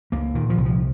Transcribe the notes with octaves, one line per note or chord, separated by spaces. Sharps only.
C#2 A#3
A#2 D#3
F3
C2
F3